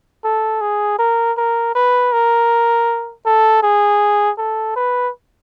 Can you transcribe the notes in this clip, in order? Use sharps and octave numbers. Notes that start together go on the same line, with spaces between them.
A4
G#4
A#4
A#4
B4
A#4
A4
G#4
A4
B4